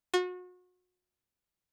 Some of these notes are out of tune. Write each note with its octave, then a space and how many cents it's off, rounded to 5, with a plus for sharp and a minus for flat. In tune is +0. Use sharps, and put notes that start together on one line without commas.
F#4 -35